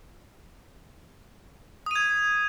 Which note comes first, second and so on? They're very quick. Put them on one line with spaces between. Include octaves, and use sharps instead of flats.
D#6 D#7 G#6